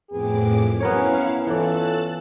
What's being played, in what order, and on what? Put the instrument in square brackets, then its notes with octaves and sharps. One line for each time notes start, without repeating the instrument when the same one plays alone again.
[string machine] F2 A2 D6 [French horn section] B3 C4 G#4
[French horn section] F#3 C#4 [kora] B3 A#4 C#5 [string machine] E4 F5
[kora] E3 D5 [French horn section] C#4 F4 A4 [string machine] E6 F#6 A6